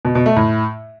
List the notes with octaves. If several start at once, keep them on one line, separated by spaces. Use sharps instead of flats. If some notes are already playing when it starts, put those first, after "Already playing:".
B2
B2
A3
A2